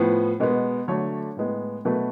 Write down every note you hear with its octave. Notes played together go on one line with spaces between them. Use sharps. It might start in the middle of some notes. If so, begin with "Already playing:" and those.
Already playing: A2 F3 B3
B2 G#3 B3
D3 F#3 A3 C#5
A2 G#3 B3
B2 F#3 A3 B4